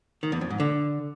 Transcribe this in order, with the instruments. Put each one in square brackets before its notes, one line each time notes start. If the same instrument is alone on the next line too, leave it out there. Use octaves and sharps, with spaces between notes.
[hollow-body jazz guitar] D#3
E2
F2
G#2
D3